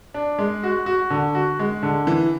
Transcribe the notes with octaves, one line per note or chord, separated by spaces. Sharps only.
D4
G#3
F#4
F#4
D3
F#4
G#3
D3
E3